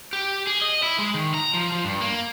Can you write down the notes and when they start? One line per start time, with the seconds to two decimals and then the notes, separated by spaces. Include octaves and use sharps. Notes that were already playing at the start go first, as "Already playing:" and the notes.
0.13 G4
0.47 G#4
0.61 D#5
0.83 E4
0.99 G#3
1.14 D#3
1.34 A#5
1.54 F3
1.72 F3
1.84 G2
2.01 A#3